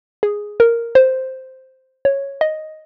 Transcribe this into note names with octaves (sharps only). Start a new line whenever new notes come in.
G#4
A#4
C5
C#5
D#5